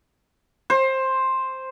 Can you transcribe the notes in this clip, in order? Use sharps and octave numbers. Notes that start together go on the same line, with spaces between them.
C5